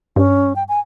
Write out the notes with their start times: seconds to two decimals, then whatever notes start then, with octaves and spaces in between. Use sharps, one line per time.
0.16 G2 C#4
0.56 G5
0.68 G#5